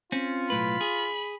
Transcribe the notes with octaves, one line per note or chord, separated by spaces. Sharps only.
C4 C#4 F4
B1 A2 B4 B5
G#4